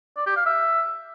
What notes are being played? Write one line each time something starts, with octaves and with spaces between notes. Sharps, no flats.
D5
G4
F5
E5